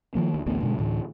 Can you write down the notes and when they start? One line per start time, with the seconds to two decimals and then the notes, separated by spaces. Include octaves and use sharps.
0.15 D#3 F3 A#3
0.34 D2
0.46 A1 D2 A3 B3
0.62 G2 B2 D3 G#3
0.79 D2 A2 E3